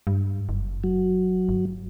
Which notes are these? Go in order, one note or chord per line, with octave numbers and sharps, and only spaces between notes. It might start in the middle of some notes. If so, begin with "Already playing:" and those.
G2
F#1
F#3
G1